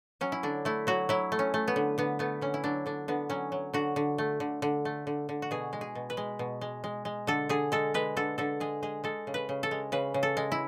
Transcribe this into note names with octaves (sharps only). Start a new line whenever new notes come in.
F#3 C#4
E4
D3 D4
A3 E4
F#3 F#4
F#3 E4
A3
C#4
A3
B3
D3
D3 B3
A3 B3
D3 C#4
E4
F#3 D4
D3 D4
D3 B3
F#3 C#4
F#3
D3 F#4
D3
A3
D3
D3
A3
D3
D3
F#4
B2 G#4
G#3
G#4
B2
B4
G#3
B2
G#3
G#3
G#3
D3 A4
D3 G#4
G#3 A4
G#3 B4
D3 A4
D3 A4
G#3 G#4
G#3 G#4
G#3 A4
C#3
B4
C#3
A4
G#3
C#3 B4
C#3
A4
G#3
E4